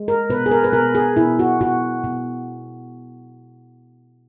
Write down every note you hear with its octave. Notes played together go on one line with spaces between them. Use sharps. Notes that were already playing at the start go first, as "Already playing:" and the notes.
Already playing: G#3
A#4
B2 B4
G#4
A#4
B4
B2 A#4
G#4
B2 E4
F#4
B2 F#4
B2